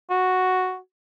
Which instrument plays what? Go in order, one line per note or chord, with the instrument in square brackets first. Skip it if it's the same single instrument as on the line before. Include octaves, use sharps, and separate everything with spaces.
[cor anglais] F#4